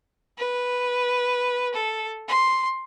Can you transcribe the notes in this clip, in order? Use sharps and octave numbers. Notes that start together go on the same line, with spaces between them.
B4
A4
C6